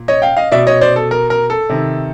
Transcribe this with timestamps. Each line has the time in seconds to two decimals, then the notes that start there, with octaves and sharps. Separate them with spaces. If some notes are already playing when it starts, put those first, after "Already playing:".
Already playing: A#2
0.08 C#5 D#5
0.22 F5 G5
0.37 D#5 F5
0.52 B2 D5 E5
0.67 C#5 D#5
0.81 C5 D5
0.96 A4
1.11 A#4
1.30 A#4
1.50 A4
1.69 C3 D#3